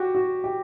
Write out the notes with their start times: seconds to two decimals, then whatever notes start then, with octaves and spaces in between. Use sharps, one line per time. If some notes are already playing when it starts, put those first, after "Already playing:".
Already playing: F#4 G4
0.15 F#4
0.44 G4